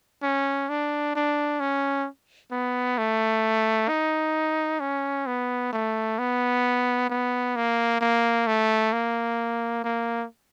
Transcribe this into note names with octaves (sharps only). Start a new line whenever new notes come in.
C#4
D4
D4
C#4
B3
A3
D#4
C#4
B3
A3
B3
B3
A#3
A#3
A3
A#3
A#3